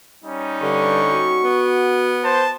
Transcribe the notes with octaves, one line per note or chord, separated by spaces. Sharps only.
G3 C#4 D#4
G2 D3 C#6
F#4
B3
C5 A5